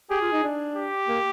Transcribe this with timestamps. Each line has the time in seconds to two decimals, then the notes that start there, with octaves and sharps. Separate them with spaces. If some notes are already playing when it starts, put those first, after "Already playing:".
0.10 G4 G#4
0.21 F4
0.32 D#4
0.43 D4
0.76 G4
1.08 A#3